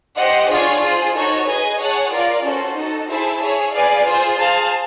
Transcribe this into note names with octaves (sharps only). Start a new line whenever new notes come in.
G4 C5 D#5 F#5
D4 F4 G#4 C#5
F4 G#4 C5
D#4 F#4 A4 C#5
G#4 B4 D#5 G#5
G#4 C#5 F#5 A5
F4 A#4 D5 F5
C#4 F#4 A4 C5
D#4 F#4 A4
E4 G#4 C5 E5 A5
G#4 C#5 E5
G#4 B4 D5 F5 G#5
F4 G#4 C5
G#4 C5 F5 A5